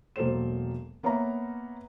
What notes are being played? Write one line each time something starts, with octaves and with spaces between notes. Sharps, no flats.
E1 F#3 A#3 A4 C5 E7
A#3 B3 C#5 E5 A#5